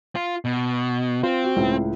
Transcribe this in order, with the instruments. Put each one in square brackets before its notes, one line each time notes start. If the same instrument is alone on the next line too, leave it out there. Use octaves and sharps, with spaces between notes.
[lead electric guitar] F4
B2
[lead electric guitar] C4 [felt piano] F4
[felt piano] F#4
C#2 A2